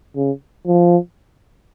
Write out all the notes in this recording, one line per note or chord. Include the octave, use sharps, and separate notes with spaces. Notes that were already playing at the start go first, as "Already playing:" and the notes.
C#3
F3